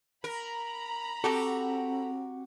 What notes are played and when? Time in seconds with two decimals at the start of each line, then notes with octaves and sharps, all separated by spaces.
0.24 A#4 A#5 B5
1.24 C4 F#4 G4 A4